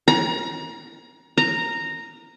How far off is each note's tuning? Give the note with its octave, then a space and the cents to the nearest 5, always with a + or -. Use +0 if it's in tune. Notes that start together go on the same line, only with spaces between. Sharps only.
A#5 +30
A#5 -10